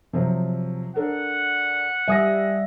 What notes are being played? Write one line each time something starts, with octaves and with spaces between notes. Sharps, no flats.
C3 F3 F#3
D4 A4 A#4 F#5
G3 E5 G#5 D#6 A#6